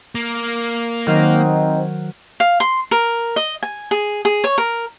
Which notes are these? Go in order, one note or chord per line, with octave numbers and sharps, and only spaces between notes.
A#3
D#3 F#3 C4 D#4 A#4 C5
F5
C6
A#4
D#5
G#5
G#4
G#4
C#5
A#4